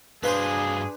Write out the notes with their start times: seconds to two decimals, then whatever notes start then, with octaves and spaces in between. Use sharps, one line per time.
0.23 G2 D4 F#4 G#4 B4 C5 F5